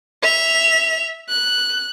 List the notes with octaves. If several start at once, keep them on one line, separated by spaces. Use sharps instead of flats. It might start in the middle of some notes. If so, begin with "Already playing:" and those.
E5 F7
F#6